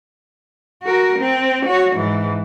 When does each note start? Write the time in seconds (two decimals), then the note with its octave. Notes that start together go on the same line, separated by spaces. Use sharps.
0.83 F#4 A#4
1.19 C4
1.66 F#4 C#5
1.96 G#2 E3